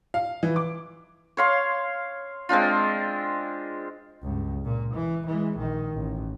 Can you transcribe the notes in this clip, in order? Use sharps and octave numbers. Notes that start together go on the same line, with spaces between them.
F5
E3
D6
C#5 F5 C6
G#3 C4 D4 F4
C#2 G2
A#2
E3
E3 G#3
A#1 D#3
A1